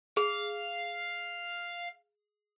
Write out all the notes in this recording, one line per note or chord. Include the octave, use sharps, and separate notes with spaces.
G#4 F5